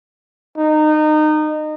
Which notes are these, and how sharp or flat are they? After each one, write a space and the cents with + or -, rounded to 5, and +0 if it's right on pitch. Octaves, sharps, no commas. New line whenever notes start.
D#4 -25